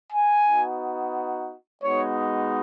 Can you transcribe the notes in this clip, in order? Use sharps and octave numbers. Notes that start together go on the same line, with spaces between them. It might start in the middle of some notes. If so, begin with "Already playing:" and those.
G#5
B3 D#4 F#4
G#3 B3 D#4 F#4 C#5